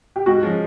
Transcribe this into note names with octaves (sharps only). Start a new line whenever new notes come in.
G4
G#2 F#4
F3 G#3 C#4